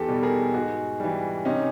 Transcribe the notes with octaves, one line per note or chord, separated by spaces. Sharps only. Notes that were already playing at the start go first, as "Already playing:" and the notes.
Already playing: E2 G4 A4
B2 G3
G#4 A#4
G#2 F#4 G#4
E3 G3
C3 C#4 D#4